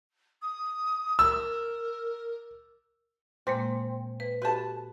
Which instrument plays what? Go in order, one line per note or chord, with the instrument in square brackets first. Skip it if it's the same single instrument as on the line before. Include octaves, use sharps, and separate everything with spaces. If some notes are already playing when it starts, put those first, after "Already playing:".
[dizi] D#6
[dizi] A#4 [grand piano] E6
[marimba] A#2 G#3 A#3 [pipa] C4
[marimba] B4
[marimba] F#4 G4 A4 [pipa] B4 A5